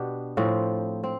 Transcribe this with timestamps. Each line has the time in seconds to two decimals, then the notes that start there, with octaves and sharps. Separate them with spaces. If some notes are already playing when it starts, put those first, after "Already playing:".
Already playing: B2 B3 D4 G4
0.37 A2 F3 C4
1.04 C4